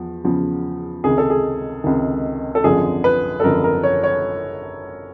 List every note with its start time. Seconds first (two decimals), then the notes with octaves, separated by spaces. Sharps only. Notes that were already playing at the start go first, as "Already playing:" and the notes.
Already playing: E2 F3
0.24 E2 C#3 F3
1.04 C#2 C3 D#3 G#4
1.18 A4
1.30 G#4
1.84 C#2 C3 D#3
2.55 A4
2.64 G#1 F#2 D3 F3 G#4
3.04 B4
3.40 A4
3.43 G#1 F#2 D3 F3 A#4
3.64 A#4
3.83 C#5
4.03 C#5